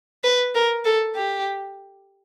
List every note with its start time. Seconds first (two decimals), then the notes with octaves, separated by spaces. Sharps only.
0.24 B4
0.55 A#4
0.85 A4
1.15 G4